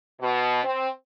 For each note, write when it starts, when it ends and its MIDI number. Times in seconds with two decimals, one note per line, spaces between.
0.20 0.63 47
0.64 0.88 60